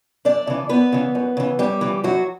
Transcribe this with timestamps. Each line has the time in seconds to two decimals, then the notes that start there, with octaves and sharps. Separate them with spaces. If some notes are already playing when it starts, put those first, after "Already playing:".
0.25 F#2 D4 D5
0.47 C#3 E3
0.69 F#2 B3 B4
0.92 C#3 E3
1.15 F#2
1.37 C#3 E3
1.59 F#2 G3 G4
1.81 C#3 E3
2.04 F#2 F#3 F#4